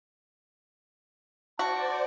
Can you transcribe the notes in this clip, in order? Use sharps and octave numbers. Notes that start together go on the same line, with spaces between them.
F#4 C5 D5 A5